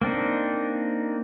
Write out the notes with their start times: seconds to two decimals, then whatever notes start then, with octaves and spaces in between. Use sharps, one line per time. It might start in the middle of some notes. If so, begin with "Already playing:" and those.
0.02 A#3 C4 D4 D#4